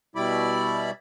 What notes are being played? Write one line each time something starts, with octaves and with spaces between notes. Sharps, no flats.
B2 G3 E4 D5 B5